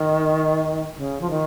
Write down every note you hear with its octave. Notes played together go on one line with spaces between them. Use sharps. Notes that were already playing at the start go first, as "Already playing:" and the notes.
Already playing: D#3
C#3
F3
D#3